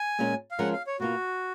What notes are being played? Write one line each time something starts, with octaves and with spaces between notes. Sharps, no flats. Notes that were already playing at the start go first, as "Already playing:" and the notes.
Already playing: G#5
A#2 G#3 C#4 F4 A#4
F5
F3 G#3 C#4 F4 A#4 F#5
F5
C#5
B2 A#3 F4 F#4